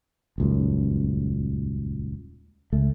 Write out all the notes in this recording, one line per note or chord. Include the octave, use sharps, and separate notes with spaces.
D#1 C#2 F#2
C#2 A3